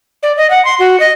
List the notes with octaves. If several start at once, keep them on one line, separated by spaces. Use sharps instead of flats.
D5
D#5
F#5
C6
F#4
D#5